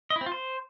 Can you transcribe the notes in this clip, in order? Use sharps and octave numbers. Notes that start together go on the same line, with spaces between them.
D#5
E4
C4
F4
C5